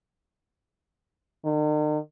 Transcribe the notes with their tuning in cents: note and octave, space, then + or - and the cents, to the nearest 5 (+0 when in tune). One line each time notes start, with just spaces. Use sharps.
D#3 -45